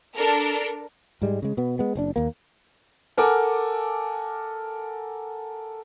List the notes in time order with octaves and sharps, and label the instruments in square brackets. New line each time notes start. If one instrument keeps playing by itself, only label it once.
[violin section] D4 A4 A#4
[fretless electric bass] G#2 G3 G#3
C#3 G#3
B2 B3
G#3 B3
F#1 C4 D4
D#2 A#3
[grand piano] A4 A#4 F#5 G#5 D6